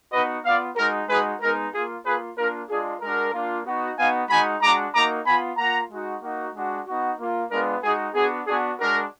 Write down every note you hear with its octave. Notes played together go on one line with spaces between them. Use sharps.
B3 D#4 F#4 B4 D#5
B3 F4 D5 F5
G#3 D#4 F#4 A#4
G#3 D#4 F#4 G#4 B4
G#3 B3 D#4 A#4
A#3 F4 G#4
A#3 F4 G#4 B4
A#3 D4 F4 A#4
G#3 D4 F4 G#4
G#3 D4 F#4 A#4
A#3 D4 F4
B3 D#4 F#4
B3 D#4 F#4 F5 G#5
G#3 D#4 F#4 G#5 B5
G#3 D4 F#4 A#5 D6
A#3 D#4 F#4 A#5 D6
B3 F4 G#5 B5
A#3 F4 F#5 A#5
G#3 D#4 F#4
A#3 D#4 F#4
G#3 D4 F#4
B3 D#4 F#4
A#3 F4
G#3 B3 D4 F4 A#4
G#3 D#4 F#4 G#4
B3 D4 F#4 G#4
B3 D4 F#4 G#4
G#3 D4 F#4 A#4